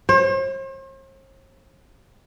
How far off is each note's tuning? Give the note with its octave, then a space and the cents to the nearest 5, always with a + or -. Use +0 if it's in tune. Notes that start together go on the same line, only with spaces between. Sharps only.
C5 +45